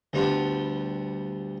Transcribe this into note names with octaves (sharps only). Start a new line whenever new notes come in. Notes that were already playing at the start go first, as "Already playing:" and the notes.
D2 G3 B3 D4 F4